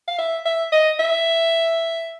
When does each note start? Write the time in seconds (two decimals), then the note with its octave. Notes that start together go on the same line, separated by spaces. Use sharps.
0.08 F5
0.19 E5
0.46 E5
0.72 D#5
0.99 E5